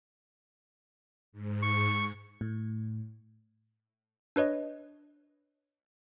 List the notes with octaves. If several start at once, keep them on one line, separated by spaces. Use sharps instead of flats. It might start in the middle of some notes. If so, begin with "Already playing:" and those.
G#2
C#6
A2
D4 B4 C#5 D#5